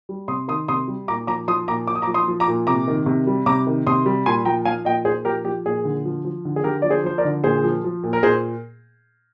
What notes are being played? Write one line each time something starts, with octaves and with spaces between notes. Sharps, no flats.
G3
C3 C6 D#6
D#3 C6 D#6
C3 C6 D#6
G3
A#2 A#5 D6
F3 A#5 D6
F3 C6 D#6
A#2 A#5 D6
A#2 D6
D#6
A#5 D6
F3
C6 D#6
F3
A#5 D6
A#2
C3 A#5 D6
D#3
C3
G3
C3 A#5 D6
D#3
C3 C6 D#6
G3
A#2 G#5 C6
F3 G5 A#5
F3 F5 G#5
A#2 D#5 G5
A#2 G#4 C5
F3 G4 A#4
F3 G4
A#2 G#4
D3
F3
F3
D3
G#4
D3 G4 A#4
F3 D5
G#4 C5
F3 C5
A#4 D5
D3
A#2 G#4 C5
F3
F3
A#2
A#4
A#2 G#4 C5